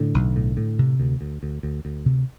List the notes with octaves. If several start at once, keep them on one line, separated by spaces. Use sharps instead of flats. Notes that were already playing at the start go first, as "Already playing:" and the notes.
Already playing: A2 D3
B1
A2
A2
C3
D2
D2
D2
D2
D2
C3